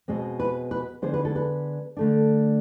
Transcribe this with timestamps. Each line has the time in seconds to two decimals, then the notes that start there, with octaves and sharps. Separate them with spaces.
0.08 B2 G#3 C4
0.40 B4
0.71 B4
1.02 D3 G#3 B3 D4 C5
1.14 B4
1.25 A4
1.36 B4
1.97 D3 A3 D4